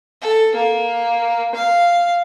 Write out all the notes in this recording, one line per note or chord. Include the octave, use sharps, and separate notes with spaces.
A4
A#3
F5